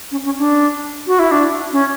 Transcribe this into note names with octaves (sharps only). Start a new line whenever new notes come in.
C#4
C#4
D4
F#4
E4
D4
C#4